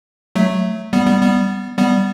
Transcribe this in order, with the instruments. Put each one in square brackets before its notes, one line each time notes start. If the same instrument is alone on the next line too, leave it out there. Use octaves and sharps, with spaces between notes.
[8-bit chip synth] F#3 A3
G3 B3
G3 B3
G3 B3
G3 B3